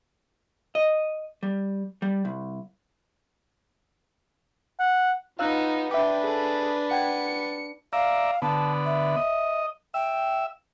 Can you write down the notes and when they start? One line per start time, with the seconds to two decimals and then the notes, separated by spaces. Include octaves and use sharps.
0.75 D#5
1.43 G3
2.02 G3
2.25 C2
4.79 F#5
5.39 B3 D#4 F4 F5 E6 F#6
5.91 D4 B4 E5 G5 D6
6.21 G#4 A4
6.91 F#5 G5 G#6 C#7
7.93 D5 E5 F5 A#5
8.42 D3 B3 A5
8.85 E5
9.16 D#5
9.94 E5 G5